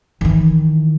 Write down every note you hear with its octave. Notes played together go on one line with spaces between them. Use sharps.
D#3 E3